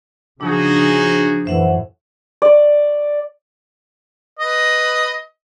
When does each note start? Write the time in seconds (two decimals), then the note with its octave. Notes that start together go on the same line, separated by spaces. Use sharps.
0.41 C#3 F3 D4 D#4 F#4 G#4
1.45 F#2 A2 E3 C5 E5 F#5
2.42 D5
4.39 B4 D#5